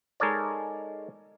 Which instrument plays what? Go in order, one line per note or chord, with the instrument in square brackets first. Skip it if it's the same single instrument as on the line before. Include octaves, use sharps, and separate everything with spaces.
[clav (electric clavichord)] G#3 D#4 A4 A#4 C#5 D5